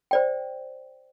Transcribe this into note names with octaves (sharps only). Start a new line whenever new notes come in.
C5 D5 G5